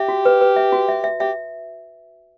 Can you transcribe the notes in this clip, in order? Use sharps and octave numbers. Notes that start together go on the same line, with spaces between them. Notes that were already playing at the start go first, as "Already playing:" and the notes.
Already playing: G4 E5
F#4
B4
B4
E5
F#4
E5
E5
G4 E5